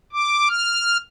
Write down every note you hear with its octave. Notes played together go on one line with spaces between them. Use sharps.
D6
F6